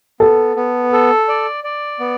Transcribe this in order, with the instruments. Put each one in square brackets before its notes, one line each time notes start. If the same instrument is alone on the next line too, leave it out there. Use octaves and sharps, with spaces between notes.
[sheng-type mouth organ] B3 [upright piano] A4
[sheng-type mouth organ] B3
A4
D5
D5
B3